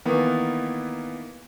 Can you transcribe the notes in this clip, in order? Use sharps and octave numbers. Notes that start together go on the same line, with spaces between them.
D#3 E3 A#3 B3